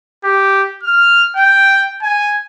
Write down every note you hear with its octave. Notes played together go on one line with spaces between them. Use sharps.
G4
F6
G5
G#5